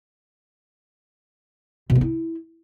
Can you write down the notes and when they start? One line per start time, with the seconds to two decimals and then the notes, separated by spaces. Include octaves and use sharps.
1.90 B2
1.95 B3
2.01 E4